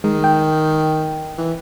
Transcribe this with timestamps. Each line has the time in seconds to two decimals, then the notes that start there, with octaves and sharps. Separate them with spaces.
0.04 D#3 G#3
0.24 G5
1.38 E3